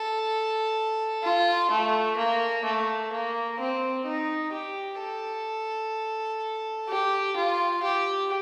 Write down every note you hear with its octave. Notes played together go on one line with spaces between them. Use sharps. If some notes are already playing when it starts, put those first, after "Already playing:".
Already playing: A4
F4
A3
A#3
A3
A#3
C4
D#4
G4
A4
G4
F4
G4